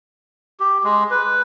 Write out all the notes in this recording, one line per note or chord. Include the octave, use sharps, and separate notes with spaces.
G4
G#3
B4